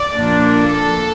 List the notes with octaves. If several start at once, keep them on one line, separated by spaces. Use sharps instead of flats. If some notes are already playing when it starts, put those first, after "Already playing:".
Already playing: D5
A#2 F3 A#3 D4
A4